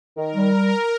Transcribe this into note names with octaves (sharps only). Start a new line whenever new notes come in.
D#3 A#4
G3